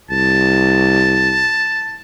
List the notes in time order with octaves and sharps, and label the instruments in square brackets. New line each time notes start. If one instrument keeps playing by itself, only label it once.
[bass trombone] C2 [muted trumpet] A5